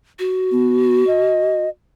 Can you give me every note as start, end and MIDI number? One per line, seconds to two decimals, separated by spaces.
0.19 1.65 66
0.52 1.05 59
1.07 1.69 75